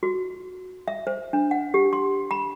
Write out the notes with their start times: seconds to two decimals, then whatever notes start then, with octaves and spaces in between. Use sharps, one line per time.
0.03 F#4
0.88 E5
1.07 C5
1.33 D4
1.51 F#5
1.74 G4
1.93 C6
2.31 B5